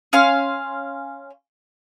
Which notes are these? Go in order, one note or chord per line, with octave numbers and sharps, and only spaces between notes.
C#4 F5 C6